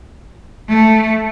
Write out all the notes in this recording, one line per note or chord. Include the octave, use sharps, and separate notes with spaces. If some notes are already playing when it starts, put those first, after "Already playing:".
A3